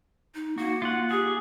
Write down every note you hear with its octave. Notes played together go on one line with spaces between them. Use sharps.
D#4
A#3 F#4
F4 F#5
G4 G#4